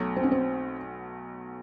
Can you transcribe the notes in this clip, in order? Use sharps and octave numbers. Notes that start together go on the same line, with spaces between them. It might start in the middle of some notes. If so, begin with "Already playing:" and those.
Already playing: B1 B2 F#3 A3
C4
C#4
C4